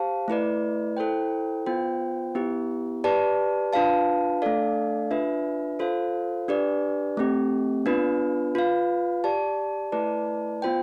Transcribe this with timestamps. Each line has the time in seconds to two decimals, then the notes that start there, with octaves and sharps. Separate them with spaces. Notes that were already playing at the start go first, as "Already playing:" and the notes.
Already playing: G4 C5 F5 A5
0.28 A3 E4 B4 D5
0.97 E4 A4 C5 G5
1.66 B3 F4 C5 G5
2.35 B3 E4 G4
3.04 G4 B4 D5 A5
3.73 D4 F4 B4 F5 A5
4.42 A3 D4 A4 D5 F5
5.11 D4 F4 B4 E5
5.79 F4 A4 C5 F5
6.48 D4 G4 B4 D5
7.17 A3 C4 G4
7.86 B3 D4 F4 B4
8.55 F4 B4 F5
9.24 G4 D5 A5
9.92 A3 E4 B4 D5 A5
10.62 B3 F4 C5 G5